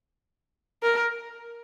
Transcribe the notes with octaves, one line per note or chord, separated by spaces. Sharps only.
A#4